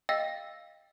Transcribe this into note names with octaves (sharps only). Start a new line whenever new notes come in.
D#5 F5 G5 E6 A#6